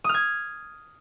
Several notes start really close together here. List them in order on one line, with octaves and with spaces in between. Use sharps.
D#6 F6 G#6